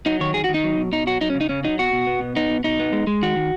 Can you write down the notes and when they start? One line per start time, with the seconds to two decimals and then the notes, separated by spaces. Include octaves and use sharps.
0.06 F#3 D#4
0.20 D#3 C#5
0.34 D#3 G#4
0.44 F#4
0.49 D#3
0.54 D#4
0.64 F#3
0.77 B2
0.92 B2 D#4
1.07 F#3 F#4
1.21 F#3 D#4
1.30 C#4
1.35 C#3
1.41 D#4
1.49 C#3 C#4
1.64 F#3 D#4
1.79 B2 F#4
1.92 B2
2.07 B3
2.21 B2
2.36 B3 D#4
2.50 B2
2.64 B2 D#4
2.79 B3
2.93 G#3
3.07 G#3
3.22 D#3 F#4
3.36 D#3